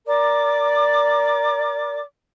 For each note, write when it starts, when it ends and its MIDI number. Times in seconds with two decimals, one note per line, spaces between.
0.06 2.01 70
0.06 2.01 74
0.06 2.01 86